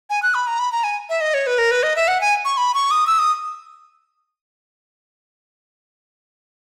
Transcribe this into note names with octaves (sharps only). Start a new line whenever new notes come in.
G#5
F#6
B5
A#5
B5
A#5
G#5
E5
D#5
C#5
B4
A#4
B4
D#5
E5
F#5
G#5
C#6
B5
C#6
D#6
E6
D#6